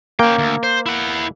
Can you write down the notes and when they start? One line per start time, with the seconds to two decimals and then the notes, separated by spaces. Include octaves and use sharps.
0.19 A#3 C#4 G5
0.38 D2
0.63 C5
0.86 E4 F#5